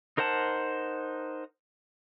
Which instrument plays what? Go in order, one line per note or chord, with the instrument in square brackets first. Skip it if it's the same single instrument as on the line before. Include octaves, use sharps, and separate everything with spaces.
[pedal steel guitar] D#4 A#4 C5 F#5 A5